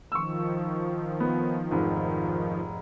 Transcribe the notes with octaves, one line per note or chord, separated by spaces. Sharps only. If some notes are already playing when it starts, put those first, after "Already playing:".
D#3 F3 C#6 E6
B3
F1 G#2